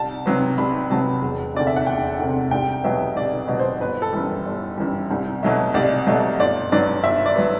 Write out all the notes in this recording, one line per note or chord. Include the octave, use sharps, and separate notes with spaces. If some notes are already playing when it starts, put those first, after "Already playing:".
Already playing: C2 A5
C3 F#3 B3
C2 B5
C3 F#3 B3 A5
E1
D2 C3 D5
E5
F#5
E1 G5
D2 C3
C2 G5
B2 F#3 B3 E5
C2 D5
B2 F#3 B3
C5
G1 B4
A4
F#2 E3 G3
G1
F#2 E3 G3
C2
B2 F#3 A3
C2 D5
B2 F#3 A3
G1 D5
G2 F#3 B3 D5
G1 E5
D5
F#3 B3